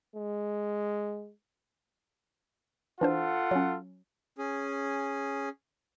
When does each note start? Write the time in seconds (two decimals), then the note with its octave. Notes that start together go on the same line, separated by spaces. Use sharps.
0.16 G#3
3.01 E3 D4 F4 A4 C5 F#5
3.51 F#3 C#4
4.38 C#4 G#4